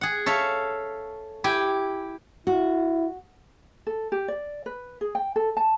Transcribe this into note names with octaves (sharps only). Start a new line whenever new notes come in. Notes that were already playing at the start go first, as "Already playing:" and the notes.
G#4 F#5
A4 C#5 E5 F5
E4 G4 G5 G#5
E4 F#4
A4
G4
D5
B4
G#4
G5
A4
A5